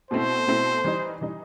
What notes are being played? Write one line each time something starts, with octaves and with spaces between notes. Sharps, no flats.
B2 A3 C4 E4 C5
B2 A3 C4 E4
E3 G3 D#4
E3 G3 D#4